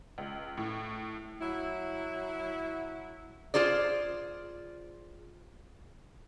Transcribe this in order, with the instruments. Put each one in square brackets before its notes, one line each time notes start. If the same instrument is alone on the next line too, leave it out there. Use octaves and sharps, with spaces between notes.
[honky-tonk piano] C#2
A2
[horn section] F#3 E4
[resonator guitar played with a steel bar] F4 G#4 C5 D5